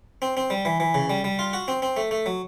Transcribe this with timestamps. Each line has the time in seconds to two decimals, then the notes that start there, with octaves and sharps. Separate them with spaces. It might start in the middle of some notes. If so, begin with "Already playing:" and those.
0.22 C4
0.37 C4
0.50 G3
0.65 E3
0.80 E3
0.94 C#3
1.10 G3
1.24 G3
1.39 F4
1.53 F#4
1.68 C4
1.82 C4
1.97 A3
2.11 A3
2.26 F#3